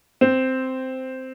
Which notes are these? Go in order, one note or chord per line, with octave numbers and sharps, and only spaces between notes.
C4